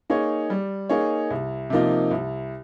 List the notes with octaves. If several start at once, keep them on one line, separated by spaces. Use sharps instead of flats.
A#3 D#4 G#4 C#5
G3
A#3 D#4 G#4 C#5
C2
C3 F3 A#3 D#4
C2